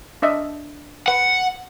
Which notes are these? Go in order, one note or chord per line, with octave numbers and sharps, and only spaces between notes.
D4 D#5 E5
B4 F#5